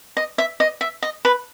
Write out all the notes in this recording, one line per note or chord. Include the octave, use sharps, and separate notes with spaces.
D#5
E5
D#5
E5
D#5
B4